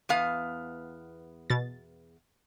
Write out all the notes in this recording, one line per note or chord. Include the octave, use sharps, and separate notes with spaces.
E2 B3 F5
B2 A6